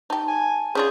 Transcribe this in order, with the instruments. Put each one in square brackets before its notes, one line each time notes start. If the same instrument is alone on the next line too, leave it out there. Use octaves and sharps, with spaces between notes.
[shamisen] D#4 G4 [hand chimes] A5
[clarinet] G#5
[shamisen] C#4 D4 F4 [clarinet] G#4 [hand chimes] G6